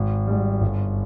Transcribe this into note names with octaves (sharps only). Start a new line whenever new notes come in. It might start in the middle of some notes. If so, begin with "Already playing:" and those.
Already playing: G#1
G#2 G3
G1